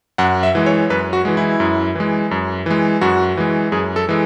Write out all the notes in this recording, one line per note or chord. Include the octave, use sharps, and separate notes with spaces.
F#2 F#5
E5
E3 G#3
C#5
F#2 B4
F#4
E3 G#3
E4
F#2
E3 G#3
F#2
E3 G#3
F#2 F#4
E3 G#3
F#2 G#4
A4
E3 G#3